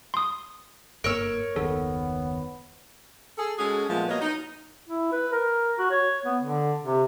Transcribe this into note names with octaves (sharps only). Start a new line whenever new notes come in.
C6 D#6
F#1 G2 A#3 A#4 C#5 E6
F#1 D#2 D#3 B3 A4
G#4 A4
G#3 C#4 F#4 G#4 A4
A#2 F3 F#3 G#3 A3 B3
F#3 A#3 F#4 B4 C#5 D#5
D#4
E4
B4
A#4
F#4
C#5
B3
D3
C3